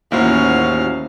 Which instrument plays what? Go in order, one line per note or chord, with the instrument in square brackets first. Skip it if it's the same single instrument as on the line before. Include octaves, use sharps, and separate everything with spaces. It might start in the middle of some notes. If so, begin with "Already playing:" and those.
[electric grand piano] A1 F#4 [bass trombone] D#2 [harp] A#3 E4 C5 [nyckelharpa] C#4 F5